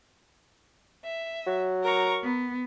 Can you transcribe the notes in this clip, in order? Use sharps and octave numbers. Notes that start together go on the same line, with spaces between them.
E5
F#3
A#4 A#5 C#6
B3